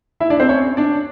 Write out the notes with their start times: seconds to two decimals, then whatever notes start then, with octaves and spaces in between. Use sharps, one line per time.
0.20 E4 E5
0.30 D4 D5
0.40 C4 C5
0.49 C#4 C#5
0.77 D4 D5